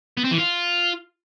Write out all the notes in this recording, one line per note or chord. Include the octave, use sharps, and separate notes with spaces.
B3
C4
E3
F4